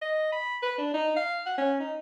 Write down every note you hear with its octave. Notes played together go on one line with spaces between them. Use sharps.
D#5
B5
B4
D4
D#4
F5
F#5
C#4
D#4